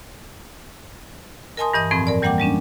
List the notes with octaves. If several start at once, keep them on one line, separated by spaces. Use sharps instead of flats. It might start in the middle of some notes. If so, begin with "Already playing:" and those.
A#4 D#5 G#5 A5 C6 D#6
G2 E3 D#5 D#6
F2 A2 F3 C4 B5
A#4 D5
E3 G3 A#3 F#5 G5 D6
G3 G#3 C#4 D4